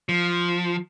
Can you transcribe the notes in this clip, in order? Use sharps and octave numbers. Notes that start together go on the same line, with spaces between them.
F3